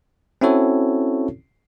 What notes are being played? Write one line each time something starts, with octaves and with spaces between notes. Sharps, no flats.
C4 C#4 E4 F#4 A4 C#5